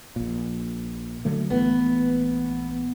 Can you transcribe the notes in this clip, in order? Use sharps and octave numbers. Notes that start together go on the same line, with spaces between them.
A#1 A#2
D3 F#3 A3
A#1 E3 A3 B3